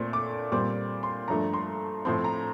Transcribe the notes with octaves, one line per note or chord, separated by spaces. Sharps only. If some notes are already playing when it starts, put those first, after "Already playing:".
Already playing: A#2 A3 C4 C6
D6
A#2 G3 C4 D6
C6
G2 F3 A3 A#5
C6
A2 F3 C4 C6
A#5